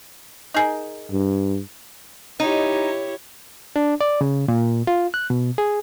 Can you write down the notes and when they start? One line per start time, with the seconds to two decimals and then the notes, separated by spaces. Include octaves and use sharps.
0.54 D#4 G#4 A#4
1.11 G2
2.40 D#4 E4 G4 C#5
3.76 D4
4.01 D5
4.21 C#3
4.48 A#2
4.87 F4
5.14 F#6
5.30 B2
5.58 G#4